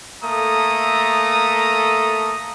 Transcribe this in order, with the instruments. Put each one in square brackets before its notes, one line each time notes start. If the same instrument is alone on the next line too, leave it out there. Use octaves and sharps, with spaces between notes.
[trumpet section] A3 A#3 A4 A#5 D#6